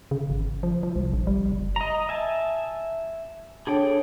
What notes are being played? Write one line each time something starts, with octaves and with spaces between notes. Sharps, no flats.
C#3
G#1
F3
F3
C2
A#1
G3
F#1
D#5 A#5
E5 G#5 A5
D4 G#4 A4 C#5 G5 A5